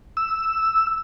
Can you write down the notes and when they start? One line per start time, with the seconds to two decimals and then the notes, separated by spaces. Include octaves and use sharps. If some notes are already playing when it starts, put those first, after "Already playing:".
0.17 E6